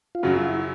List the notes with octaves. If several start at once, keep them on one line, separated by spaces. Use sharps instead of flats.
F4
F#2 C#3 F#3 F#4
F4
E4